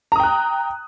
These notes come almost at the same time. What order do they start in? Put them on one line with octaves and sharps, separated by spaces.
A#5 D#6 G5 F#6